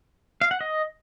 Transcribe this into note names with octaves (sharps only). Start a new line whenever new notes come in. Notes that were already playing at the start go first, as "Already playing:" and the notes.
F5
F#5
D#5